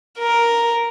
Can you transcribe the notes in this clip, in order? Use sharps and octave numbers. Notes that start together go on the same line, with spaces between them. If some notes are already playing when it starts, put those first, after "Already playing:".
A#4